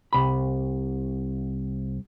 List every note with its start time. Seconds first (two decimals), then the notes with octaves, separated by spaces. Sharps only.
0.13 C2 B5